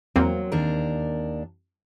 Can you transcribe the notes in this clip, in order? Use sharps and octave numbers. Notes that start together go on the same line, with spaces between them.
E2 F#3 A#3 C4
D#2 D4 A#4